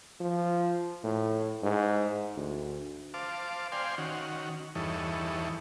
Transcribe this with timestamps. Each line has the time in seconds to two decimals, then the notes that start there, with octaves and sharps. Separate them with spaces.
0.20 F3
1.04 A2
1.63 G#2
2.36 D2
3.14 C5 F5 A5 D6
3.72 C5 D5 F5 G5 G#5 C6
3.98 D#3 C#4 F#4
4.75 E2 G2 E3 D#4 A4 C#5